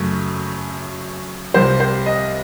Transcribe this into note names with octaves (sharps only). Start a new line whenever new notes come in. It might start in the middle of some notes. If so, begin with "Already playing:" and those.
Already playing: F#2 C#3 F#3 A3
C2 C3 F3 C4 C5
C5
D#5